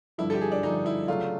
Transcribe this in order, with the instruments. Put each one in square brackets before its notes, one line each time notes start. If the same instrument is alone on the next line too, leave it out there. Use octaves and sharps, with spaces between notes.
[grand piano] G2 D3 F3 [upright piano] E4
[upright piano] A4
G4
G#4
D4
[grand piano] G2 D3 F3 [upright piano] D#4
[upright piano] E4
[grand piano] C#3 F#3 A3 D4 [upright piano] F4